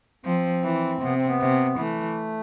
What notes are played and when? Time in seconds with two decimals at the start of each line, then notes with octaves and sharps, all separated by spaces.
0.25 F3 C4
0.64 E3
1.01 C3 B3
1.14 C4
1.27 B3
1.40 C3
1.78 E3 A3